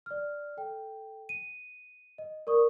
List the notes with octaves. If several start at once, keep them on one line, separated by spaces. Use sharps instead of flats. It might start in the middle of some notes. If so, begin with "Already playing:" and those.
D5 F6
A4 G5
D#7
D#5
A#4 D5 C#6 D#6